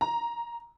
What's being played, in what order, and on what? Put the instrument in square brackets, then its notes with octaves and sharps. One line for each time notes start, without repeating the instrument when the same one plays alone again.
[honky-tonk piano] A#5